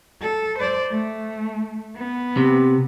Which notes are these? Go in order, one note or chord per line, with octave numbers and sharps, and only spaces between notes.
A4
C5 D5
A3
B3
C3